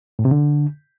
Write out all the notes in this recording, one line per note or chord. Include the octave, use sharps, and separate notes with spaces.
A2
C3
D3